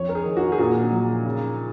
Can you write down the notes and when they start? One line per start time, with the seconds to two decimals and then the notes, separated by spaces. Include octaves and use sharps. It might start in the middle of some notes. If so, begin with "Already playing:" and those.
Already playing: F2 C#5
0.09 A#4
0.15 G#4
0.25 D#3
0.37 F#4
0.52 G#4
0.58 A#2 F#4
0.92 F#3
1.25 C#3